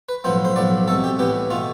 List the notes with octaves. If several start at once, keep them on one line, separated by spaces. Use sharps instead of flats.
B4
B1 A2 F3 B3 C5
C5
B1 A2 F3 B3 D5
C2 B2 A3 A4
G4
A2 E3 B3 G4
B2 A3 F4